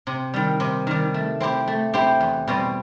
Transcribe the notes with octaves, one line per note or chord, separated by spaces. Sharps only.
C3
D#3 G3
C3
D#3 G3
A3
C4 E4 G4 C5
A3
C4 E4 G4 C5
E2
B2 G3 C4